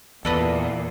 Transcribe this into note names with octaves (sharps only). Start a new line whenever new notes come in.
E2 A#2 A4 B4 D5 D#5